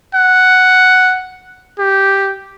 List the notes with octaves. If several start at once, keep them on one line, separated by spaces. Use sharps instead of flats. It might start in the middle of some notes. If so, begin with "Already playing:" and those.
F#5
G4